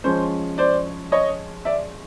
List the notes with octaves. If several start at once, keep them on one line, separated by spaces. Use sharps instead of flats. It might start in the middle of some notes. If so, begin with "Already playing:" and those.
F3 G#3 C#4 C5
C5 D5
C#5 D#5
D5 E5